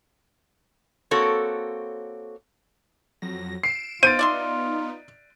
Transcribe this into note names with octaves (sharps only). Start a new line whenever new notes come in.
A#3 C4 F#4 A4 C#5
F2 F#3 A#6
C7 D7 E7
B3 D#4 F4 C5 A6 D7 D#7
D5 E5 C6